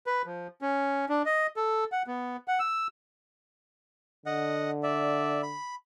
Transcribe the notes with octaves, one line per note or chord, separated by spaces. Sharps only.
B4
F3
C#4
D4
D#5
A4
F#5
B3
F#5
E6
D3 D#5 F#5
D5 E5
B5